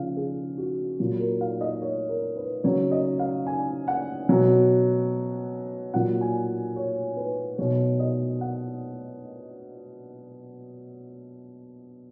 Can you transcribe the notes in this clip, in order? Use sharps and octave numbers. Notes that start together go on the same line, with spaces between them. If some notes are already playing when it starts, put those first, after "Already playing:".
Already playing: C#3 F3 F5
G#4
F#4
A#2 F#3 F#4
A#4
F5
D#5
C#5
A#4
B4
C#3 F#3 C#5
D#5
F5
G#5
F#5
B2 F#3
A#2 F#3 F#5
G#5
C#5
B4
B2 F#3 C#5
D#5
F#5